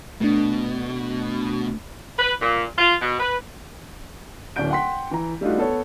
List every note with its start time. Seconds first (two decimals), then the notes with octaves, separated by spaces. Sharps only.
0.21 B2 A3 D4
2.19 B4
2.42 A#2
2.78 F4
3.02 B2
3.20 B4
4.56 D1 C#4 D4 G6 D7
4.70 F#5 G5 C6 B6
5.11 E3 A#5
5.41 G3 A3 D4 D#4 F4 F#4
5.57 B3 A4 C#5